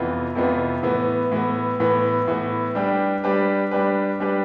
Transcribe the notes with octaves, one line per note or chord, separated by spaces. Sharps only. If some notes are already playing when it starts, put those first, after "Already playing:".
Already playing: F2 C3 E3 B3 F4
F2 C3 E3 B3 F4
A2 E3 B3
A2 E3 B3
A2 E3 B3
A2 E3 B3
G3 D4 G4 B4
G3 D4 G4 B4
G3 D4 G4 B4
G3 D4 G4 B4